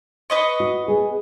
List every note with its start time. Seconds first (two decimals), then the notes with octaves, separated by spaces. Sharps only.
0.30 B4 D#5 C#6
0.60 F#4
0.88 B3 G#4